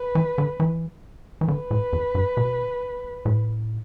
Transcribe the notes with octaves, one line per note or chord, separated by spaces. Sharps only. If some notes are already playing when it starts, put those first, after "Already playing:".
Already playing: B4
E3
D3
E3
E3
D3 B4
A2
E2
G2
B2
A2